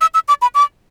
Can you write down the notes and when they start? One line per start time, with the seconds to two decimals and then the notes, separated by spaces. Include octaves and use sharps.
0.01 E6
0.14 E6
0.28 D6
0.42 B5
0.55 D6